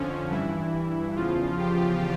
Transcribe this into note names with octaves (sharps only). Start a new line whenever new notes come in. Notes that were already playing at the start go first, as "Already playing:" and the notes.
Already playing: F2 D3 F3 C#4
G2 E3 E4
E2 C#3 F3 F4
G4